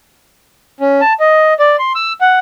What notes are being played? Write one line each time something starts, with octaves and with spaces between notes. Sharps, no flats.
C#4
A5
D#5
D5
C6
E6
F#5